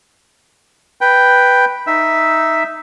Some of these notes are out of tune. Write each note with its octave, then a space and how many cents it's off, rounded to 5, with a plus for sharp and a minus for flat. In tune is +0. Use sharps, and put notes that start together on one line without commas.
B4 +0 G5 +0
D#4 +0 E5 +0